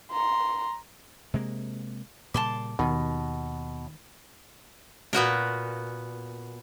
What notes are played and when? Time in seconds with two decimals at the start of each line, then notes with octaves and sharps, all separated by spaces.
0.11 A#5 C6
1.34 C3 G#3 A#3
2.34 A#2 C#3 G3 A5 C6 D6
2.79 D#2 B2 D#3
5.13 A#2 B3 F#4 A#4